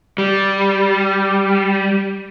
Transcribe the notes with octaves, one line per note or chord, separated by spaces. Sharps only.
G3